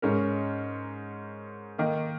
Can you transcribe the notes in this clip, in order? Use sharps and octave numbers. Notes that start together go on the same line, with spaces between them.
G#2 G#3 C#4 A#4
D#3 A#3 D#4